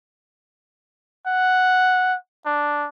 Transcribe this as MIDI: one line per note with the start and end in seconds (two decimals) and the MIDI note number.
1.27 2.15 78
2.46 2.88 62